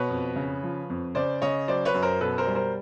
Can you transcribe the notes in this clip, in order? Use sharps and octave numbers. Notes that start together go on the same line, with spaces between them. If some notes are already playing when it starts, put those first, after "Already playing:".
Already playing: B2 B4 C#5
F2
C#3
F3
F2
C#3 C5 D5
C#3 C#5 D#5
F#3 C5 D5
B4 C#5
F#2
A#4 C5
B2 A4 B4
A#4 C5
G3
A#4 C5